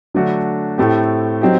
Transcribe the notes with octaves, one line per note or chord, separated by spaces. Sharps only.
D3 F#3 A3 D4 F#4
A2 A3 C4 G4
F#3 C4 D#4 G4